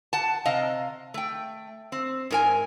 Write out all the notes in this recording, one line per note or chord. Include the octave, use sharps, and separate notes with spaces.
F#5 A5
C3 D#5 F5
A3 G5
C4
G#2 A#4 G#5